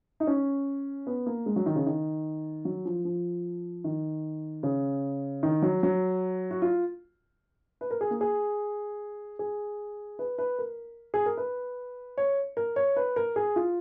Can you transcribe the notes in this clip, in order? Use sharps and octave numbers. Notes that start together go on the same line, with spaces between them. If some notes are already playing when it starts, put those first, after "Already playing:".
D#4
C#4
B3
A#3
G#3
F#3
D#3
C#3
D#3
F#3
F3
F3
D#3
C#3
D#3
F#3
F#3
F#4
F4
B4
A#4
G#4
A#3
G#4
G#4
B4
B4
A#4
G#4
A#4
B4
C#5
A#4
C#5
B4
A#4
G#4
F4